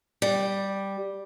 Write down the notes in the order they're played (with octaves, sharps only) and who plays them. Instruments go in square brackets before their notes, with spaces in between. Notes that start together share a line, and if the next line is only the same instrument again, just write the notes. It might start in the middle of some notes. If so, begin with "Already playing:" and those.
[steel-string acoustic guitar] G3